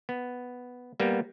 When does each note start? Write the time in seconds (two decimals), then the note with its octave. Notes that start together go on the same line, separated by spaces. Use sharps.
0.09 B3
1.00 G3 A#3 B3